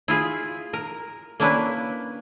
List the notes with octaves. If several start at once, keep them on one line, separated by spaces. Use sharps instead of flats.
E4 F4 G#4
A#4
A#3 C#4 D4 E4 B4